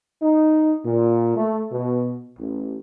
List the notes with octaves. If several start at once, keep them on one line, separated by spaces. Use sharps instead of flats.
D#4
A#2
A3
B2
A1